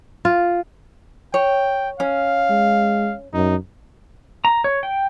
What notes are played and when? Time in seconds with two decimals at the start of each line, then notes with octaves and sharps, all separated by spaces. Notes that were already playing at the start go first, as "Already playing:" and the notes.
0.25 F4
1.34 C#5 G5
2.00 C#4 F5
2.50 G#3
3.34 F#2 D#4
4.45 A#5
4.64 C#5
4.83 G5